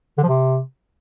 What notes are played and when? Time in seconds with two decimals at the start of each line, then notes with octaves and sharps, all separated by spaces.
0.18 D3
0.23 F3
0.28 C3